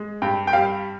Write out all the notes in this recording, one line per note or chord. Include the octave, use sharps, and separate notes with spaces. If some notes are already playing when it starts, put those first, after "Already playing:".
Already playing: G#3
G2 G5
G5
G3 F5